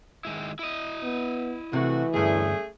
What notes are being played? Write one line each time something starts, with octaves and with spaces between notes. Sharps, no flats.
D#3 G#3 E4
E4 D#5
B3
C3 E3 A3 F#4
D2 G2 A3 C#4 G#4